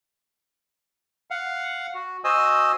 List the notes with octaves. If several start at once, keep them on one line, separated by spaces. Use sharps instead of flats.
F5 F#5
F#4
F#4 C5 D#5 G#5 D#6 E6